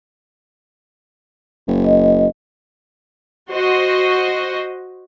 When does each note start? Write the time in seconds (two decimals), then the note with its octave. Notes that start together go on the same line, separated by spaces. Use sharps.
1.68 F#1
1.85 D#5
3.49 F#4 C5 D#5